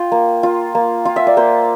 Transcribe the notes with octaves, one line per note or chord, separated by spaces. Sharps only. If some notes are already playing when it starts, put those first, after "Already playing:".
Already playing: F4 G5
A#3
F4
A#3
F4
E5
D5
A#3 C5